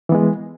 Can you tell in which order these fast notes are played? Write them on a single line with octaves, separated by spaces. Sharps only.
E3 B3 G#3